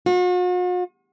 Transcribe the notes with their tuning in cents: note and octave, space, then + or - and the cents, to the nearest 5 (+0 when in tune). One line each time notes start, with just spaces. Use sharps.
F#4 -45